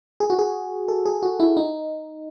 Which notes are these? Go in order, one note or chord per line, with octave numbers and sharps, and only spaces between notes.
G#4
F#4
G#4
A4
G#4
F#4
E4
D#4